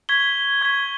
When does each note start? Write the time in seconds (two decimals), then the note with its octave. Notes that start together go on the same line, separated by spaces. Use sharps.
0.09 C#6 G#6 B6 G7
0.61 C#6 G#6 B6 G7